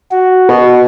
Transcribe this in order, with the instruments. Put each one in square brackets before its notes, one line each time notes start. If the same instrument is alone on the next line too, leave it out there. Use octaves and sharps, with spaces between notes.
[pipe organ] F#4
[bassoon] B2